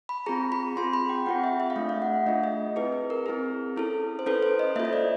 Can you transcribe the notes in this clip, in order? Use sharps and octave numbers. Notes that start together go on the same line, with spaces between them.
B5
C4 F4 G#4 A#5
B5
C4 F4 G#4 C6
B5
G5
C4 F4 G#4 F#5
E5
E5
F5
A3 D4 F4 G#4 E5
F5
F#5
E5
A3 D4 F4 G#4 D#5
D#5
C4 E4 G#4 B4
B4
A#4
C4 E4 G#4
C#4 E4 A4
C5
C#4 E4 A4 B4
C5
D#5
A#3 C#4 F4 A4 E5
D#5
D5